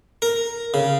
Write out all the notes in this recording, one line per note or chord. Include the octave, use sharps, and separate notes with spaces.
A#4
C#3